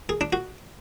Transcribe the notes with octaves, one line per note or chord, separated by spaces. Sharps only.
G#4
D4
F#4